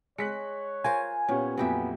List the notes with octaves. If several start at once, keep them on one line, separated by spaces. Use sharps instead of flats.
G#3 C#5 F#6 B6 C#7
F4 A#4 C5 G#5
A#2 B3 C#4 G4 C#5
F2 A#2 F#3 B3 G4 E5